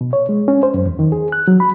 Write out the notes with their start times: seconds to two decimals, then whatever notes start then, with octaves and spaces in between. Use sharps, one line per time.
0.01 B2
0.13 C#5
0.29 G#3
0.48 C#4
0.63 C5
0.74 F#2
0.86 E2
0.99 D#3
1.12 G#4
1.32 F#6
1.48 F#3
1.60 B5